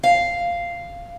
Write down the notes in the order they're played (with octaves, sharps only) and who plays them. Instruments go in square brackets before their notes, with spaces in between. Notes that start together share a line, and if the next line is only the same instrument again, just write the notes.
[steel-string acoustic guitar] F5